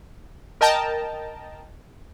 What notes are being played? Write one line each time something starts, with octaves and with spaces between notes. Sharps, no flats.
A#4 D#5 G5 A5 A#5